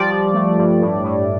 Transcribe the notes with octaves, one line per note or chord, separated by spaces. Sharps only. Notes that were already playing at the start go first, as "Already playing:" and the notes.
Already playing: F3 G3 D5
F3
A3
G2
A2
A2